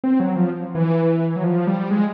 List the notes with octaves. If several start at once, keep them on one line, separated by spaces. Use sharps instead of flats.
C4
F#3
F3
E3
F#3
F3
G3
G#3